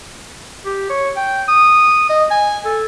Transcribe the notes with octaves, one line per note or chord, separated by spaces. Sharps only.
G4
C#5
G5
D#6
D#5
G#5
A4